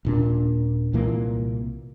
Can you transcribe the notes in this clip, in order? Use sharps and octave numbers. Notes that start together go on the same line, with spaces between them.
D#1 A#2 D4
C2 A#2 E3 A#3